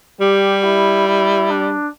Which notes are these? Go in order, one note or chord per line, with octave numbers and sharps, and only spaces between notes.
G3 G4
E4
E4
D4